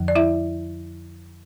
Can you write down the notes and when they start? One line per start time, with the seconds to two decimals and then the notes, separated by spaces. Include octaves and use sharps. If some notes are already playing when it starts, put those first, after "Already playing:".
Already playing: F2 D3 F3
0.08 D5
0.15 E4 E5